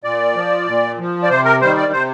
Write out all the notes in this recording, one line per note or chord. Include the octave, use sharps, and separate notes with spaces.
A#2 D5
F3
A#2
F3
D5
C3 C5
A#4
D#3 G3 C5
D5
C3 C5